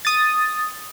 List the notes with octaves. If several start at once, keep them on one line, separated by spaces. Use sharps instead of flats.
D#6 A6